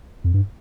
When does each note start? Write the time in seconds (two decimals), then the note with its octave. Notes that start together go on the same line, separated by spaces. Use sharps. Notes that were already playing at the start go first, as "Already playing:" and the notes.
0.24 F2
0.34 G2